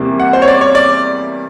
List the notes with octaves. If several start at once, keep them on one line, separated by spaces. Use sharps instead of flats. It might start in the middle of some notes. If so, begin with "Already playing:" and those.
Already playing: E2 C3 E3 G3 A#3
F#5
C5
C#5
D5
C#5
D5